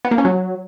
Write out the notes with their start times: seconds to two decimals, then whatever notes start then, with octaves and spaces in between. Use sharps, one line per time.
0.05 B3
0.11 A#3
0.18 C#4
0.25 F#3